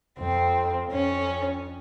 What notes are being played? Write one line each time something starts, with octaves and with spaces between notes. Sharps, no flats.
F2 C4
F2 C#4